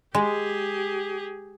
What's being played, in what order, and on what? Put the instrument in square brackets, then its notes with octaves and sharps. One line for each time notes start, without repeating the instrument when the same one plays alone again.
[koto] G#3 [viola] G4 G#4